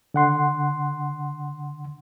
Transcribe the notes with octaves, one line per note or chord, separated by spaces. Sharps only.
D3 F#5 C6